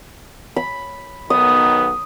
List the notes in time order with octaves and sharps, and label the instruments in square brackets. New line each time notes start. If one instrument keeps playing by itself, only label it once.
[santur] B5
[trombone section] B1 D#3 B3 [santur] D#6